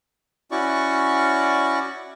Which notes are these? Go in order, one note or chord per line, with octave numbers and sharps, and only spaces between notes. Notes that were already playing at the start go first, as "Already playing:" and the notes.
C#4 E4 F#4 D5 C#6